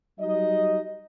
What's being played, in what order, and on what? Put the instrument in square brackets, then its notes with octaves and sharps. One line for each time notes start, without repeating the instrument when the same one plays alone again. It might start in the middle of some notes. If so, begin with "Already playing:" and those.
[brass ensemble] F#3 G3 D#4 D#5